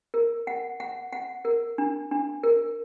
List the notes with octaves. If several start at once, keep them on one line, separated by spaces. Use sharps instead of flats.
A#4
F#5
F#5
F#5
A#4
D4
D4
A#4